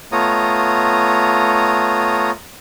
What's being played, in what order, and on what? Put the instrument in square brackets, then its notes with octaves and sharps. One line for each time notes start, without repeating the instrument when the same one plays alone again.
[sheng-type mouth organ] A3 B3 F4 C#5 A#5 D#6